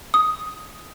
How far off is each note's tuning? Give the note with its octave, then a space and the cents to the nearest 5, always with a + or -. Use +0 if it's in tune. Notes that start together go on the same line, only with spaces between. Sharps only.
D#6 +5